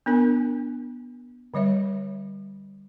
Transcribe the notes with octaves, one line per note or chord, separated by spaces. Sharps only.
B3 D4 A#4 G#5
D3 G3 C#5 E5